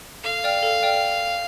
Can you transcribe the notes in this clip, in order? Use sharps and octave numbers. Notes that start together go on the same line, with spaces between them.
A4 F5
D5 G5 F6
A4
D5 G5 F6